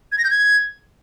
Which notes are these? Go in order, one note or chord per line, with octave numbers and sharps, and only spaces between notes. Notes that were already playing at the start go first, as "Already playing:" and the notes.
G#6
A#6
G6
G#6